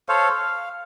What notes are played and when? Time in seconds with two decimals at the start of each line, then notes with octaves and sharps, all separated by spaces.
0.09 A4 C5 C#5 F5
0.31 F5